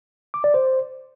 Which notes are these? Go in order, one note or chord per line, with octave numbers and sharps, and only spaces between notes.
D6
D5
C5